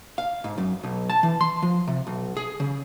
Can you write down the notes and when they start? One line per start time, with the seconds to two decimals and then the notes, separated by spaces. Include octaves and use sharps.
0.18 F5
0.44 G#2
0.58 F#2
0.83 B1
1.10 A5
1.23 E3
1.41 C6
1.62 F3
1.87 C3
2.07 B1
2.37 G#4
2.60 C#3